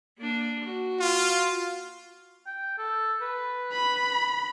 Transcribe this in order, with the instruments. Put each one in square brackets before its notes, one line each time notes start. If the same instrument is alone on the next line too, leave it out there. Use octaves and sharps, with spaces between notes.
[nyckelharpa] A#3 D4
F#4
[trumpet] F4
[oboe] G5
A4
B4
[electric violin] B5